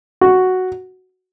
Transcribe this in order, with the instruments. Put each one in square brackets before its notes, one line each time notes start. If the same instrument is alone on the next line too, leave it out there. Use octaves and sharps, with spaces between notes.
[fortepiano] F#4